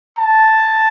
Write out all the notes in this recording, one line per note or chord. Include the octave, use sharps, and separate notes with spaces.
A5